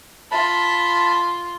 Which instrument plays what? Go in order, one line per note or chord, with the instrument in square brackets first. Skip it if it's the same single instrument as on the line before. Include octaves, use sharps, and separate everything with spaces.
[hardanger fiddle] F4 [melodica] A5 B5